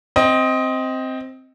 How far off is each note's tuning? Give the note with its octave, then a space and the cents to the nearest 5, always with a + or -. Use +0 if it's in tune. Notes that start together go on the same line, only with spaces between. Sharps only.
C4 +0 D#5 +15